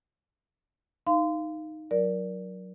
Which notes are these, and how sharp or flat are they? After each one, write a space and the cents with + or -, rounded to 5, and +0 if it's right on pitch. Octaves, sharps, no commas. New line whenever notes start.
D#4 +0 F5 -15 C6 -30
F#3 +0 A#4 +15 D5 -10